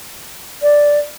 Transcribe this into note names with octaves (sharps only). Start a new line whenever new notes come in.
D5